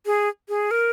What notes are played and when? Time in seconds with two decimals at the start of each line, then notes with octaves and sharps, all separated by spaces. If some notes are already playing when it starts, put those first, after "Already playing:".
0.06 G#4
0.49 G#4
0.71 A#4